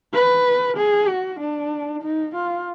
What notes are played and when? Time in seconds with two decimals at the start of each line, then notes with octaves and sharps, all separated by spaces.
0.14 B4
0.77 G#4
1.08 F#4
1.39 D4
2.02 D#4
2.35 F4